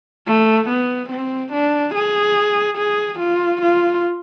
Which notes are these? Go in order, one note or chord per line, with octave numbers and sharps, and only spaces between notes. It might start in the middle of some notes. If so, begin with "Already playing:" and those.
A3
B3
C4
D4
G#4
G#4
F4
F4